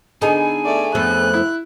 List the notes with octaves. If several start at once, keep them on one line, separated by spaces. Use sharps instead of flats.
D3 B3 D#4 G#4 A4 G#5
A3 D5
F2 A3 B3 F#6
E4